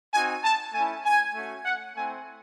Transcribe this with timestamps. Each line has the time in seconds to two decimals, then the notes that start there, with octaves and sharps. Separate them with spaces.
0.12 C4 D#4 F#4 G#5
0.43 A5
0.73 A3 C#4 E4 G#5
1.03 G#5
1.33 A3 C#4 F#4
1.64 F#5
1.94 A3 C4 E4 G#5